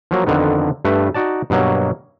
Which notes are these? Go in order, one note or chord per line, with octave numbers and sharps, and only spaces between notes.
F3 F#3 A#3
F2 D3 D#3 B3
G2 A3 B4
D#4 F#4 D5 A5
G2 B2 F#3 A#3